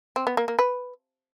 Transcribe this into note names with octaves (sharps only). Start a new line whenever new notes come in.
C4
B3
A#3
A#3
B4